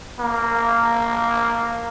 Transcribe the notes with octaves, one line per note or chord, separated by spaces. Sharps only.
A#3